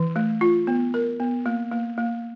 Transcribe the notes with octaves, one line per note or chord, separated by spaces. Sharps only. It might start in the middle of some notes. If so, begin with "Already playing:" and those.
Already playing: E3
A3
F4
B3
A#4
B3
A#3
A#3
A#3